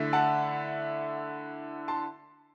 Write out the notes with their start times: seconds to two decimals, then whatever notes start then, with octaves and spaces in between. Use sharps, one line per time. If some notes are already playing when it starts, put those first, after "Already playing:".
Already playing: D3 A3 E4
0.13 F#5 A5
1.88 A5 C6